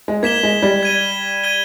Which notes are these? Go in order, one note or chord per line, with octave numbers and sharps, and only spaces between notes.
G#3
A#3 G#6 B6 E7 G7
G#3
G3
G#6 D#7 G7
G#6 D#7 G7